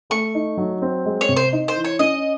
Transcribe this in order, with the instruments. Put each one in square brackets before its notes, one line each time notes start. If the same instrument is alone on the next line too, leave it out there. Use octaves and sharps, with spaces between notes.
[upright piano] A3 [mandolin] C#6
[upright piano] D#4
F#3
C4
G#3
[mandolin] C#5
[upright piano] C3
[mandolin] C5
[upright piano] D#4
[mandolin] C5
[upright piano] E3
[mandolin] C#5
[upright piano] C#4 [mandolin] D#5